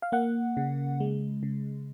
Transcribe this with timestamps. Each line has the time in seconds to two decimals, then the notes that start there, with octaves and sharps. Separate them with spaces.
0.02 F5
0.12 A#3 F#5
0.57 C#3
1.00 G#3
1.43 C#3